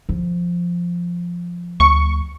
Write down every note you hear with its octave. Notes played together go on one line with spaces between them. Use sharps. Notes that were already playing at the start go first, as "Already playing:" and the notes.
F3
D2 C#6